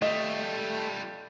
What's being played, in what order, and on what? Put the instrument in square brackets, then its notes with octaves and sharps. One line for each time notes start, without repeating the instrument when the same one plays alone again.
[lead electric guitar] G3 F4 [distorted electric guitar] A3 [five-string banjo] D#5